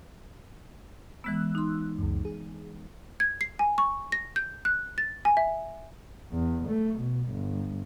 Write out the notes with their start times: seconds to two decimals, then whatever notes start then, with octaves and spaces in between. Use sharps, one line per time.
1.24 E3 G#3 B3 E6 F#6
1.55 D#4 C6
1.98 C#2 F#2
2.25 G#4
3.20 G#6
3.41 C7
3.59 G#5
3.78 C#6
4.12 A#6
4.36 G6
4.65 F#6
4.98 A6
5.25 G#5
5.37 E5
6.32 E2
6.68 A3
6.99 B2
7.30 G1